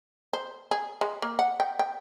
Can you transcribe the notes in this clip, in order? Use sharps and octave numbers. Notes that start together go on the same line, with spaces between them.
C5
G#4
G#3
A#3
F#5
G5
G5